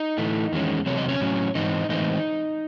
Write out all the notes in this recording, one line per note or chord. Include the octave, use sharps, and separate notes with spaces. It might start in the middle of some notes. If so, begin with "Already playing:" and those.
Already playing: D#4 D#5
A2 E3 A3
E2 D#3 G#3 C#4
E2 C3 F#3 C4 C#5
D#5
C#4 C#5
A2 F#3 C#4
G#2 E3 C4 D#4 D#5
A2 E3 G#3 C4 D#4 D#5